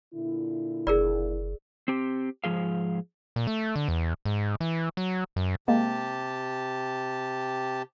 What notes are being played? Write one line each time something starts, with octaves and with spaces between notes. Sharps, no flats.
A#2 D3 E4
F#1 G#4 A#4 D5
C4 G4
G#2 E3 F3 G#4 F5
A#2
A3
D3
E2
G#2
E3
F#3
F#2
C3 G#3 A#3 G4 A5